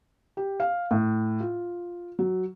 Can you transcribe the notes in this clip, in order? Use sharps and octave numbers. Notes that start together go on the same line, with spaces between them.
G4
F5
A2
F4
F#3